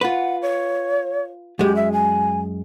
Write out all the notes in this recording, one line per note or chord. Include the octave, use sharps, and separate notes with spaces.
F4 B4 F#5
C#5
F#2 G#3 G4
E5
G#5